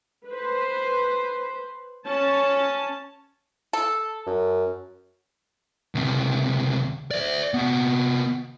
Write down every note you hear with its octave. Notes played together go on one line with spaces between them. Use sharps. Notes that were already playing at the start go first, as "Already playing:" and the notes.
B4 C5
C#4 A5
A4
F#2
C#2 C3
D5 E5
C3 B3